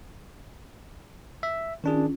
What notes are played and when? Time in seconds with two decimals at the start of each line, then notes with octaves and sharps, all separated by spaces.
1.43 E5
1.84 D#3 C#4 D4 F4 G#4